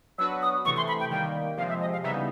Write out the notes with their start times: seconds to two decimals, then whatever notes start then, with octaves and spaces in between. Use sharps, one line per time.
0.18 F#3 B3 D4 F#4 B4 E6
0.42 D#6
0.65 C3 E3 A3 C#6
0.77 C6
0.88 B5
1.00 G5
1.11 D#3 G3 A#3 G5
1.57 C3 F3 G#3 C4 F5
1.69 E5
1.81 D#5
1.92 F5
2.04 C#3 E3 G3 B3 D#4 E5